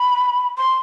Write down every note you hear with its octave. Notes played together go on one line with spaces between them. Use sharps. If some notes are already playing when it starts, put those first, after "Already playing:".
Already playing: B5
C6